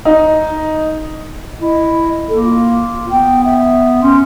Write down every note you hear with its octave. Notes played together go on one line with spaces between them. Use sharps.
D#4
E4 D#5
A#3 A4
F4
B3 G5
E5
C#4 C6